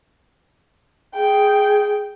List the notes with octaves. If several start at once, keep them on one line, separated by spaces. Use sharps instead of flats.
G#4 G5